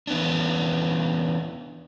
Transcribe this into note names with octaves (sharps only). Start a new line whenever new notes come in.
E3 B3 C#4 D4